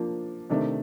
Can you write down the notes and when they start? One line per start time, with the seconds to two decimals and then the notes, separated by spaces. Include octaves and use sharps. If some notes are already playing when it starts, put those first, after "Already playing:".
Already playing: F3 A#3 D4
0.50 C3 D#3 A3 D4